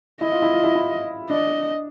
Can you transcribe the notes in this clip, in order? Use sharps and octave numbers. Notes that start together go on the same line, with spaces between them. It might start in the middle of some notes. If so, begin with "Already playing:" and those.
E4 D#5
F4
E4
F4
E4
E4
D4 D#5